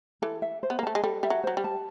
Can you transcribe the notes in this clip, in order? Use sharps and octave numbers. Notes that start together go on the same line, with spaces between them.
E3 A4
E5
C5
B3
A#3
A3 A5
G#3
G3 A4
G3 E5
F#3
F#3 C5
G3
A5